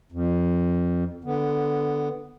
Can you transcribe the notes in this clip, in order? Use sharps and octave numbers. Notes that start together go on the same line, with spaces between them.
F2
D3 B3